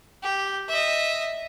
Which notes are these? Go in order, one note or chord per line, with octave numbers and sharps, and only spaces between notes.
G4
D#5 E5